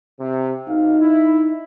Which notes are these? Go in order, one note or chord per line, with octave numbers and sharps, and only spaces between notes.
C3
B1 D#4 F5
E4